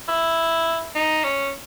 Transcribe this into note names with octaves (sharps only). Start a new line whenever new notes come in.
E4
D#4
C#4